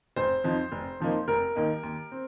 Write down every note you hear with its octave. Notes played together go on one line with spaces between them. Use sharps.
F1 C5
F2 F3 D#4
F1
F2 F3 A#3 D#4
F1 A#4
D#2 D#3 A#3 D#4
D#2
C4